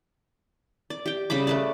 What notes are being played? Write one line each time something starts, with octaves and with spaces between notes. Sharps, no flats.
D5
G4 G5
C#3 G3 B5 D6
A3 B4 D5